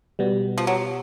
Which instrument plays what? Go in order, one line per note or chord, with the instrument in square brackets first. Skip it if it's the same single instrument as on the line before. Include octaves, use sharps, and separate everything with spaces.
[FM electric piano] B2 G3 B3
[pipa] F3
F#3